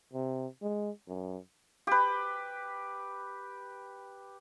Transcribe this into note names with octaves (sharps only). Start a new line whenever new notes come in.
C3
G#3
F#2
G4 B4